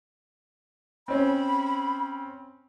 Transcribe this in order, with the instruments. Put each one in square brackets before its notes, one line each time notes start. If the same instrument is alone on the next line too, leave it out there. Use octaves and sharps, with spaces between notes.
[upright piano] C4 C#4 [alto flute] B5